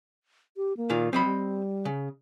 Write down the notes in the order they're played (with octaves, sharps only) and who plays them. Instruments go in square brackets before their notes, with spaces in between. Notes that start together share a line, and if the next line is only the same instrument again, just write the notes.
[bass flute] G4
A#3
[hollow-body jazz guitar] A#2 D#3 F4
[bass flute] F#3 [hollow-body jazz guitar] C4 D#5 B5
[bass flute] G3
[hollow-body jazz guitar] C#3